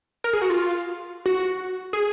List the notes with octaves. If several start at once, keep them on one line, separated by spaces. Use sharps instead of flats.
A#4
G#4
F#4
F4
F#4
G#4